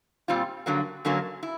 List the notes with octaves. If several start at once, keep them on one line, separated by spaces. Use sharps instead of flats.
A#2 G3 C4 F4
G2 D3 F#3 A#3
F#2 D3 F#3 A#3 C#4
E4